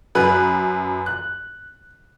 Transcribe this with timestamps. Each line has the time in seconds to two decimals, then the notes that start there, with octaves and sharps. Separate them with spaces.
0.15 F#2 B4 F#6
1.06 F#6